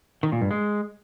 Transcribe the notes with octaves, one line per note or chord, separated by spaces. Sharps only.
D#3
A#2
G2
G#3